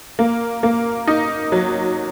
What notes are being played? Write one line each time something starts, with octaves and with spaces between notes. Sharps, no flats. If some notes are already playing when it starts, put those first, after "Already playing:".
A#3
A#3
D#4
F#3